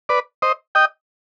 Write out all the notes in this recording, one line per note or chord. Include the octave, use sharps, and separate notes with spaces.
B4 D5
C5 D#5
D#5 G5